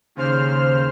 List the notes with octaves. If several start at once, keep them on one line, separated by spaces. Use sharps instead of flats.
D#2 C#3 C5 F6